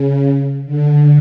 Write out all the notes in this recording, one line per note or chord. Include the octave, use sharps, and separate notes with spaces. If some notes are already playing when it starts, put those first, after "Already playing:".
Already playing: C#3
D3